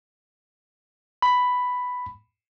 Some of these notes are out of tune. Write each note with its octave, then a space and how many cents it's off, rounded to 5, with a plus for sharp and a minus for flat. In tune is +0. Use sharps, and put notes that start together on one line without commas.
B5 +5